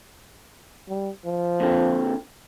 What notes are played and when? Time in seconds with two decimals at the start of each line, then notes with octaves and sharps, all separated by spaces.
0.88 G3
1.25 F3
1.60 A#2 D3 C4